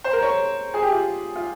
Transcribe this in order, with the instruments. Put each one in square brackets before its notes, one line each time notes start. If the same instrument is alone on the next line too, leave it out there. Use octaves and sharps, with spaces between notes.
[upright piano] C5
A#4
C#5
G#4
G4
F4
F4